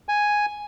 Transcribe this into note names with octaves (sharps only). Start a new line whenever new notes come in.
G#5